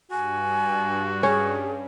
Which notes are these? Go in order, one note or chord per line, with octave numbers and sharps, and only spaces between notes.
G2 F#4 G#5
C#4 G#4